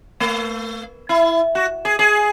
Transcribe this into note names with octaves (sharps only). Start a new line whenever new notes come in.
A3
E4
F#4
G#4
G#4